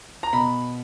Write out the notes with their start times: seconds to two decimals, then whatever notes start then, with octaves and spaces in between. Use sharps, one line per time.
0.23 A#5
0.33 B2 B5